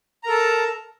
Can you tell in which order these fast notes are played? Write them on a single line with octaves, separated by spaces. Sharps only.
A#5 A#4 A4 A5